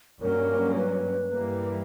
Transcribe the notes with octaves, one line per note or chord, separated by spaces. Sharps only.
G2 F#3 A#3 C#4 A#4
B4
G2 E3 G3 A#3